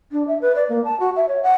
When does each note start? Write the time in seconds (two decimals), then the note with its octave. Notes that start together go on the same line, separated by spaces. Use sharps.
0.12 D4
0.28 E5
0.42 B4
0.56 D5
0.69 A#3
0.85 A5
1.00 F#4
1.16 E5
1.29 C#5
1.43 F#5